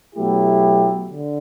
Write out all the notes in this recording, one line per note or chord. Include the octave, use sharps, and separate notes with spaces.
B2 F#3 A3 E4 G4
D3